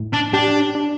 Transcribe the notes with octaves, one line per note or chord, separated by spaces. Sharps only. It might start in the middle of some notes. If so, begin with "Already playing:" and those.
Already playing: A2
D4
D4 G4
D4